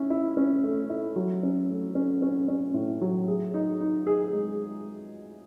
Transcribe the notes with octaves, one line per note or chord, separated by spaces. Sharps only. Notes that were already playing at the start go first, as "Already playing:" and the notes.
Already playing: C#4 E4
E4
C#4
A3
E4
F#3
C#4
A3
C#4
C#4
C#4
A2
F#3
G#4
D#4
D#4
G#4
G#3